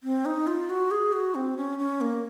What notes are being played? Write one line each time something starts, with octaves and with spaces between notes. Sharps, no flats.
C4
D#4
F4
F#4
G#4
F#4
C4
C#4
C#4
A#3